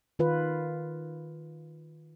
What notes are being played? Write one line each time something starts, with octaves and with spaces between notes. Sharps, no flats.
D#3 F4 B4